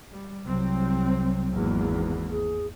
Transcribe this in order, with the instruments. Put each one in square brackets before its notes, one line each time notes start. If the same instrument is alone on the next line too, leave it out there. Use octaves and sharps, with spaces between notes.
[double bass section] G3
[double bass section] C2 C3 C4 [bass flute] F#3
[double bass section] G#1 E2 A#3
[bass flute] G#4